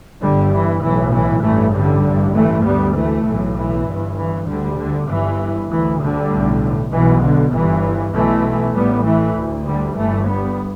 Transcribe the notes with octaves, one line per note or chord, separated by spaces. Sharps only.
G1 G2 D3 G3
E3
B1 A2 E3
E3
A1 G2 E3 A3
D3 G3
A1 G2
E3 A3
D2 G3 B3
E3 A3
B1 A2 E3
E3
G1 G2
E3
D2 D3 G3
D3
G1 G2 E3
D2 E3
D3 G3
B1 A2
B1 B2 E3
D3
G1 E3
G2
B1 B2 E3 A3
A1 A2 G3 B3
E3 A3
D2
D3 G3
G1 G2 E3 A3
G3 B3